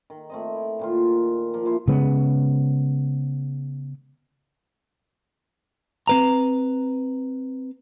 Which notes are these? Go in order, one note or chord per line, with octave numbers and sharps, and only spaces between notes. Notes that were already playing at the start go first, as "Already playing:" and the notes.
D#3
A3 C4 D#5
E4
A#2 D#3 F4
F3 A#3
F3 E4 C5
C#3 G#3 B3
C4 B4 A#5